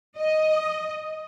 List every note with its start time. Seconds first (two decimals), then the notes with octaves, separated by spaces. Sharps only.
0.17 D#5